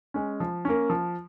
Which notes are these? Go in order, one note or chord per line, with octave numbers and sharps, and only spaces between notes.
G#3 C#4
F3
A#3 C#4
F3